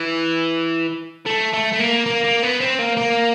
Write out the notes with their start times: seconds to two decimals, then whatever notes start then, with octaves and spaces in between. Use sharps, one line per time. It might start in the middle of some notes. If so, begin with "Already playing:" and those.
Already playing: E3
1.26 A3
1.53 A3
1.73 A3
1.80 A#3
2.06 A#3
2.24 A#3
2.43 B3
2.60 C4
2.79 A#3
2.97 A#3